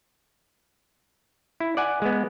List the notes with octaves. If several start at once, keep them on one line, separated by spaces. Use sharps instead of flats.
E4
D5 F#5 G#5
G#3 B3